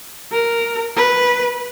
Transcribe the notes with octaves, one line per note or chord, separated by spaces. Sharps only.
A#4
B4